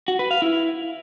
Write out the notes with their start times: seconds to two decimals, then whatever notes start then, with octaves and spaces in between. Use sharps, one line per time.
0.08 F#4
0.19 B4
0.31 F5
0.42 E4